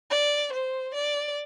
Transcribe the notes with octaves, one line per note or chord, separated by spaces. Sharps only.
D5
C5
D5